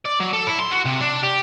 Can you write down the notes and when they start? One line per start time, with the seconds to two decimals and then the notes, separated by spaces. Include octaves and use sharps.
0.06 D5
0.20 F#3
0.33 A4
0.47 E4
0.60 C6
0.72 F#4
0.86 C3
1.01 D4
1.23 G4